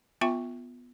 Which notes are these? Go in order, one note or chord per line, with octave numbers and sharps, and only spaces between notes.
B3 F4 E5 G5 C#6